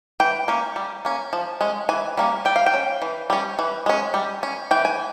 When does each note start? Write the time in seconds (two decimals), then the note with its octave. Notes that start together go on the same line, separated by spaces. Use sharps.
0.20 E3 G5
0.48 A#3 C#4
0.76 G3
1.05 A#3 C#4
1.33 F3
1.61 G#3 C#4
1.89 E3 G#5
2.17 G3 A#3 C#4
2.45 G3 G5
2.56 F5
2.66 G5
2.74 C#4
3.02 E3
3.30 G3 C#4
3.59 E3
3.86 G#3 C#4
4.14 G3
4.43 C#4
4.71 E3 G5
4.85 G#5